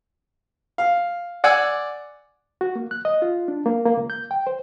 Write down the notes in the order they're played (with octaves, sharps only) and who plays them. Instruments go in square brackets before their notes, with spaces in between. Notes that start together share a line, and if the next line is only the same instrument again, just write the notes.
[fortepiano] F5
D5 F#5 G#5 D6 E6
[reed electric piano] F#4
A#3
F#6
D#5
F4
D4
A#3
A#3
C#2
G6
G5
C5